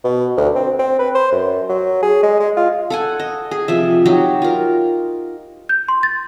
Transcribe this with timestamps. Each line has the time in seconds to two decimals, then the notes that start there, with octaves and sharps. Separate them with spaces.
0.04 B2
0.37 D2
0.55 C4
0.79 C4
0.99 B4
1.15 C5
1.32 F#2
1.69 F#3
2.02 G#4
2.23 G#3
2.39 G#3
2.57 F4
2.90 A4 F#5 G#5
3.19 D#5
3.51 G#4
3.68 C3 F3 E5
4.06 F#3 D#4 G4
4.42 F4 A#4
5.69 G6
5.88 C6
6.03 A6